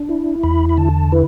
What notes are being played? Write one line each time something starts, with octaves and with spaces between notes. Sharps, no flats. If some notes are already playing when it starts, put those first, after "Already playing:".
Already playing: D4
E4
E2 B5
B5
D3 A5
E4 B4